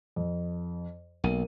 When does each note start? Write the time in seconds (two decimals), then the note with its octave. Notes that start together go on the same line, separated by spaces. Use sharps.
0.16 F2
1.24 B1 A#3 D#7